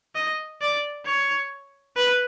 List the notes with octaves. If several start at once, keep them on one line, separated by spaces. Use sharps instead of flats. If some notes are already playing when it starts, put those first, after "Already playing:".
D#5
D5
C#5
B4